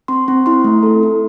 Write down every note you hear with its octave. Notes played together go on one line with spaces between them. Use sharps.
C4 C6
C4
E4 C6
A3
A4
E4